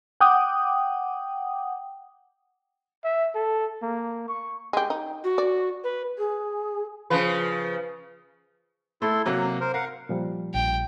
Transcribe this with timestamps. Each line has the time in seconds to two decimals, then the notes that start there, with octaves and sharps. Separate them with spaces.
0.21 F#5 G5 D6 D#6
3.04 E5
3.35 A4
3.82 A#3
4.28 C#6
4.73 G#3 G4
4.90 D#4
5.24 F#4
5.38 D5
5.84 B4
6.18 G#4
7.10 C#3 F3 B4
9.02 A3 E4 A4 C6
9.26 C3 F#3 A#3 F#4
9.61 A#4 C5
9.74 A#4 F5 F#5
10.09 A#2 F3 G3
10.54 A#1 G5